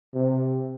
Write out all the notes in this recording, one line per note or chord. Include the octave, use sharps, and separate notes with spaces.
C3